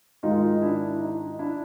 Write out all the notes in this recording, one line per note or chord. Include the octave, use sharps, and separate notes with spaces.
G#2 D#3 G#3 D#4 F4
D4 E4
D#4
D4 E4